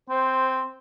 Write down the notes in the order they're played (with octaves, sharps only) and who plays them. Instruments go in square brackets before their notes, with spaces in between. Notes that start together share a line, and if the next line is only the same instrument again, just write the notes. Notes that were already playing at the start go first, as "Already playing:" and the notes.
[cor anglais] C4 [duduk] C5